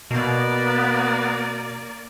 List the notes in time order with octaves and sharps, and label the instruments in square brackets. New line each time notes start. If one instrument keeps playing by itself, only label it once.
[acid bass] B2 [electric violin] A#3 D5 [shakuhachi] B3